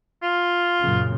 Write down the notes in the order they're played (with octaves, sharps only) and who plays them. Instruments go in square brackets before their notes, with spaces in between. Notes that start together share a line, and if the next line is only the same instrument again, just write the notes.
[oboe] F4
[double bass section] F#2 A#2 C#3